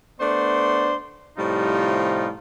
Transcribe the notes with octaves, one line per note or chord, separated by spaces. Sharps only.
A3 B3 D4 C5 D5 C6
A2 C3 F3 G3 D#4 F4